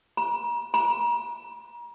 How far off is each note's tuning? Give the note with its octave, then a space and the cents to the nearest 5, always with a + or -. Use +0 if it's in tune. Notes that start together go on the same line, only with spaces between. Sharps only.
A#5 +35
A#5 +35